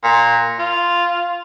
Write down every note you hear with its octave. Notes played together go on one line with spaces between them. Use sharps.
A#2
F4